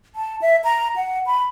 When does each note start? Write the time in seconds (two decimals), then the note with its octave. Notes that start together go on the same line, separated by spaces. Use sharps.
0.15 A5
0.42 E5
0.64 A#5
0.96 F#5
1.26 B5